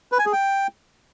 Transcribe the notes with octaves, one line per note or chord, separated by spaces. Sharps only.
B4
G#5
G#4
G5